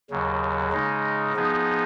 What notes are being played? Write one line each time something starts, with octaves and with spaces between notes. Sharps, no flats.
D#2 C#3 F#3
C#3 G#3 D#4
F3 B3 D#4 G#4